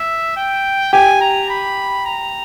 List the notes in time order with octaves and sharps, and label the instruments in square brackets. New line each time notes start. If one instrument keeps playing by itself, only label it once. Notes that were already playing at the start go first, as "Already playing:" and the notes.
Already playing: [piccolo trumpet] E5
G5
[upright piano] G4 [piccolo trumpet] G#5
[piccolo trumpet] A#5
B5
A#5